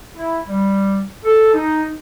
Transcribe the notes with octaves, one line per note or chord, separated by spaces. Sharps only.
E4
G3
A4
D#4